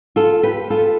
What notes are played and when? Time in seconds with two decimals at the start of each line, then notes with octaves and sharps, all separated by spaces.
0.16 F4 A4
0.43 G4 B4
0.70 F4 A4